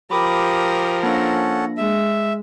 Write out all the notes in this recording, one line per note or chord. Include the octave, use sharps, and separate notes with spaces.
F3 G4 A#4 B5 D6 D#6
A#3 C#4 D4 A4 F#5 A#6
G#3 E5